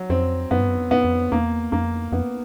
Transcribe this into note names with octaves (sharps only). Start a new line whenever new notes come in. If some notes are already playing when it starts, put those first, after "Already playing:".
Already playing: F#3
F2 C4
F#2 B3
G2
F#2
F2
B3
F#2
F2
E2 A#3
F2 A#3
F2 B3